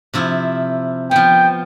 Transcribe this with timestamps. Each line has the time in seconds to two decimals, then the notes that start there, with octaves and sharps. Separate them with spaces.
0.14 C3 F3 E4
1.11 F3 B3 G5